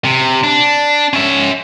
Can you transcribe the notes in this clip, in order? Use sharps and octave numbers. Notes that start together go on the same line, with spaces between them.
C3
D4
C#4 E5